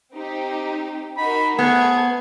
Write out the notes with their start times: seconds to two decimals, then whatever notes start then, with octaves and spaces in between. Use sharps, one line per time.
0.14 C4 D#4 G4
1.17 D#4 F#4 A#4 B5
1.59 A3 B3 G#4 C5 G#6